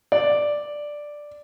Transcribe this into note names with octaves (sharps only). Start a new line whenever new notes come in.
D5